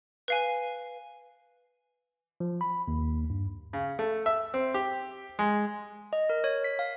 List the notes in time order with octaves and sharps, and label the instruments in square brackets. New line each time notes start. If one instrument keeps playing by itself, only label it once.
[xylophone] B4 F5 G#5
[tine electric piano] F3
B5
D#2
G2
[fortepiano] C#3
A3
E5
C4
G4
G#3
[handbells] D#5
A#4
C#5
B6
F5